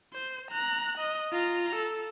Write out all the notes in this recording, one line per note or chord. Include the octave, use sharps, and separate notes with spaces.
C5
A#5 F#6
D#5
F4 A#5
A4